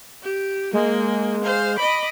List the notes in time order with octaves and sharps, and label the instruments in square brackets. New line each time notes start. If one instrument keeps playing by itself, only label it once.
[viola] G4
[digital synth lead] G#3 [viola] A#3
[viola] C5 F5
[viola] D#5 D6 [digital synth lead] B5